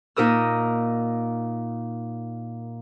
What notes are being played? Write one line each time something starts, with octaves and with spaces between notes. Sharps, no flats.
A#2 D#4 A#4 D#6 E6